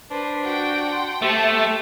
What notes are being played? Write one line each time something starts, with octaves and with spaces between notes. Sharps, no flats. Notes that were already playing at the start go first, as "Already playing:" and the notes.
D4 B4 C5
F#4 F#5 G5
C6
A3 G4 C5 E5 A5